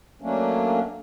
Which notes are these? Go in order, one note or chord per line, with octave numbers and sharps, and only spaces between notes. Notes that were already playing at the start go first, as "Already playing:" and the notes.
F#3 A3 A#3 C#4 D4